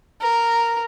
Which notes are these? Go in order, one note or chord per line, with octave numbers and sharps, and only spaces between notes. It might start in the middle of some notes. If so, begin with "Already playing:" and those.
A#4